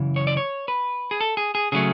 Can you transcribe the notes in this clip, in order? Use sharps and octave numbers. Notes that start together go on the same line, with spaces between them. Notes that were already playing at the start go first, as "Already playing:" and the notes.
Already playing: F#2 C#3 E3
C#5
D5
C#5
B4
G#4
A4
G#4
G#4
C#3 F#3 A3 G#4